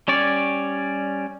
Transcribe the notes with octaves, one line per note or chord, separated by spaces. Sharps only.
G3 C#4 C#5 D5